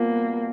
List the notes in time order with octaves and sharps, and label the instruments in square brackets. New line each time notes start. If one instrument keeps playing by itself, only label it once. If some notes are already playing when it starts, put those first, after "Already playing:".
Already playing: [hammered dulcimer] B2 G3 C4 F4 [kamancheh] A#3